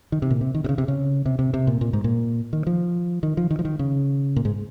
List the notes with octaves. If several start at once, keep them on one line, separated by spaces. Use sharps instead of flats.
D#3
C3
A#2
C3
D#3
C3
C#3
C3
C#3
C3
C3
C3
A#2
A#2
G#2
A#2
D#3
F3
D#3
F3
D#3
F3
D#3
C#3
A#2
G#2